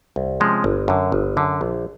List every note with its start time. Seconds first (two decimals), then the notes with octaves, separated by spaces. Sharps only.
0.16 C2
0.40 C3 F3 G#3 C#4
0.64 G1
0.88 F#2 D3
1.12 G1
1.37 F#2 D3
1.61 A#1